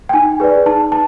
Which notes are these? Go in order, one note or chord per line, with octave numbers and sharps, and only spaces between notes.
G5
D#4 G#5
G#4 B4 D5
D#4 A5
A5